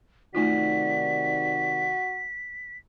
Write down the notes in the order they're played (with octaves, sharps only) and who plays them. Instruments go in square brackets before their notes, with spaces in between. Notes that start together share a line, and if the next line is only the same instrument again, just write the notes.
[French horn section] C3 D#3 D5 [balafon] A3 D#4 F4 [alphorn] F#4 [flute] B6